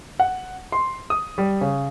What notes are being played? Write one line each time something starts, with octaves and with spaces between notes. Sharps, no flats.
F#5
C6
D#6
G3
C#3